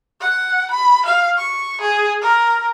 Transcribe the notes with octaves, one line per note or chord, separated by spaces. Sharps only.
F#5
B5
F5
C#6
G#4
A#4